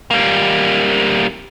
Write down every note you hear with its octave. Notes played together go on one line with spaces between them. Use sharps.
G3 A#3